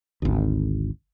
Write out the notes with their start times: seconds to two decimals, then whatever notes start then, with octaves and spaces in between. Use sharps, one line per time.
0.22 G#1 D2